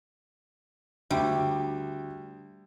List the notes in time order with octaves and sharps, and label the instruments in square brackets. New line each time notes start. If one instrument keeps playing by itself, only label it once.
[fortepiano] D2 [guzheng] G3